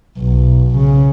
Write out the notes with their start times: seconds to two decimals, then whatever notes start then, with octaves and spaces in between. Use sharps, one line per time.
0.19 B1
0.76 C#3